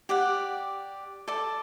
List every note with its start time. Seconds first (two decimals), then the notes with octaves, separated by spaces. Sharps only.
0.09 G4 D5 F#5
1.28 A4 D5 A5